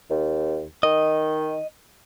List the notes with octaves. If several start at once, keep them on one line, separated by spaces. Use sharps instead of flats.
D#2
D#3 D#5